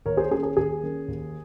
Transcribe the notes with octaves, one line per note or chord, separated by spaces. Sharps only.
D#2 A#4 C#5
G#4 C5
D#3 A#3 C#4 G#4
G#4
D#2 G#4
D#3 A#3 C#4
D#2